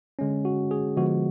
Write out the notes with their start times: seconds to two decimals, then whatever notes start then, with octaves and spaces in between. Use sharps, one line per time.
0.19 D3 G#3 C#4
0.45 F#4
0.71 G#4
0.96 D3 F3 G#3 B3 F#4